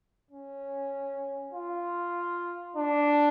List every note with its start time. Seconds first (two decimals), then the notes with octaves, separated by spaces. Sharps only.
0.31 C#4
1.53 F4
2.76 D4